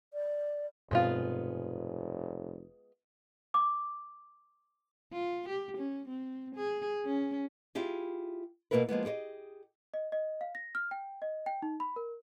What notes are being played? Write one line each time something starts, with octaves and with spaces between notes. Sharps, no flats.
D5
F1 G2 B2 G#3 B3 C4 F4
D6
F4
G4
C#4
C4
G#4
C#4
E4 F4 G4 G#4
B2 D#3 A#3 E4 A#4 B4
F3 G#3 A#3 B3
G4 G#4 C5 D#5
D#5
D#5
F5
A#6
F6
G5
D#5
G5
D#4
B5
A#4